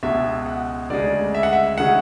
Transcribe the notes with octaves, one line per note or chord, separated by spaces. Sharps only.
C#2 B2 G#3 E5
F#5
D2 C#3 G#3 D5
E5
F#5
E5
C#3 G#3 F#5